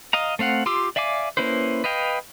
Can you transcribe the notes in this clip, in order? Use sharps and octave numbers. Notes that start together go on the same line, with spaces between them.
D#5 F5 A#5
A3 C4 F5 F#5
F4 G4 C6 D6 E6
D5 E5 F5 G#5 D6
A#3 C#4 E4 B4 C5
B4 D#5 F5 G5